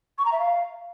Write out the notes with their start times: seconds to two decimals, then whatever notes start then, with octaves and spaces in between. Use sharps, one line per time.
0.18 C#6
0.25 A#5
0.32 E5
0.39 F5